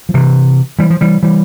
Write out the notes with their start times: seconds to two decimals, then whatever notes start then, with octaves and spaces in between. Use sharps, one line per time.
0.09 F3
0.14 C3 E3
0.79 E3 G3
0.90 F3
1.01 E3 G3
1.23 E3 G3